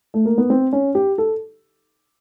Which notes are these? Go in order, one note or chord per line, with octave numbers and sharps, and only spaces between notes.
A3
A#3
B3
C4
C#4
G4
A4